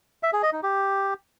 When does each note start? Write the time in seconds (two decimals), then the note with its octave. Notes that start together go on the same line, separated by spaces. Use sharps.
0.23 E5
0.33 G#4
0.43 D#5
0.53 D#4
0.63 G4